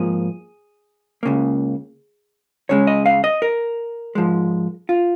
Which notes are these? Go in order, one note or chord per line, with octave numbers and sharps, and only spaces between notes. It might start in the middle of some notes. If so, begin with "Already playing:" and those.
Already playing: G#2 F3 A#3 G#4
C#2 C#3 A#3
C#2 C#3 G#3 C#5
D#5
F5
D#5
A#4
G#2 F3 G#3
F4